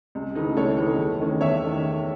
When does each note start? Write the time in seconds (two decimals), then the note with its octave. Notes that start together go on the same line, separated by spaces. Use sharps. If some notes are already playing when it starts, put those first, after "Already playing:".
0.15 C#2
0.35 C#3 E3 A3 D#4
0.57 C#2 A4 C#5
0.78 C#3 E3 A3 D#4
0.98 E2
1.20 D#3 A3 C#4
1.41 E2 C#5 E5
1.62 D#3 A3 C#4